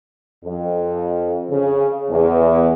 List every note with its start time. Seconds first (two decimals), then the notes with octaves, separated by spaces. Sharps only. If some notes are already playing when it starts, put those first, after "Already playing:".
0.44 F2
1.50 C#3
2.10 E2